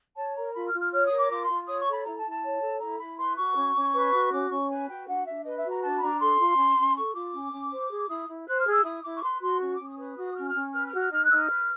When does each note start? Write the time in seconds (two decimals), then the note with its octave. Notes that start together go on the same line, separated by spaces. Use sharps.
0.16 C#5 A5
0.35 A#4 A#5
0.54 F4 B5
0.67 F6
0.72 F4
0.79 F6
0.92 C#5 F6
1.05 D#6
1.11 A#4
1.17 D6
1.30 F4 D6
1.42 C6
1.48 F4
1.67 C#5 D#6
1.79 C#6
1.87 A4
1.93 B5
2.05 E4 A#5
2.18 A5
2.24 E4
2.30 A5
2.43 C#5
2.61 A4
2.80 E4 A#5
2.99 E4 B5
3.18 B4 C6
3.37 F#4 C#6
3.56 C#4
3.75 C#4
3.93 B4
4.12 F#4
4.32 C#4 D6
4.50 C#4 C#6
4.69 B4 G#5
4.88 F#4 G5
5.07 D4 F#5
5.25 D4 E5
5.44 B4 D#5
5.57 E5
5.64 F#4
5.70 A#5
5.82 D4 A5
5.95 B5
6.01 D4 A#5
6.20 A4 C6
6.39 F4
6.57 C#4
6.77 C#4
6.95 A4 C#6
7.14 F4 D6
7.33 C#4
7.52 C#4
7.71 C5
7.90 G#4
8.08 E4 D#6
8.28 E4
8.46 C5 F#6
8.60 F6
8.65 G#4
8.72 E6
8.84 E4 D#6
9.03 E4 D6
9.15 C#6
9.22 B4 C6
9.41 F#4 C6
9.60 C#4 C#6
9.73 D6
9.79 C#4
9.86 D#6
9.97 B4 D#6
10.16 F#4 D#6
10.35 C#4 F6
10.48 F6
10.54 C#4
10.73 B4 F6
10.85 F6
10.92 F#4
10.99 F6
11.10 D#4 F6
11.23 F#6
11.30 D#4 E6
11.35 F6
11.49 B4